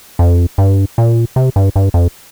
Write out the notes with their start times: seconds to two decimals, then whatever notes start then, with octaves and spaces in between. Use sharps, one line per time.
0.19 F2
0.58 G2
0.98 A#2
1.36 C3
1.56 G2
1.76 G2
1.94 F2